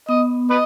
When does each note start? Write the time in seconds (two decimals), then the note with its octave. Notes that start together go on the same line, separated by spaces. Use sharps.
0.09 B3 D#5
0.50 B4 D#5